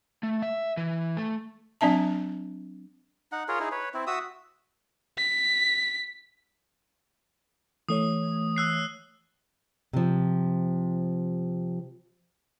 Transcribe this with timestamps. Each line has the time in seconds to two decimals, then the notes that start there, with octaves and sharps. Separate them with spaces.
0.23 A3
0.42 E5
0.77 E3
1.17 A3
1.81 F#3 C4 D4 E5 A5
3.32 D#4 F#5
3.48 F4 G#4 A#4 C#5
3.60 D#4 E4 G#4
3.72 B4 C#5
3.94 C4 E4
4.07 F#4 E5 D#6 E6
5.18 B6
7.89 E3 A3 C#5 D#6
8.56 E6 F#6 C7
9.93 C3 F3